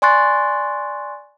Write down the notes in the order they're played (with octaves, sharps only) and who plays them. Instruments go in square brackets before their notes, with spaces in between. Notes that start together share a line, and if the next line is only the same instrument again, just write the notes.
[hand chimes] D5 G#5 C6 C#6 F#6 A6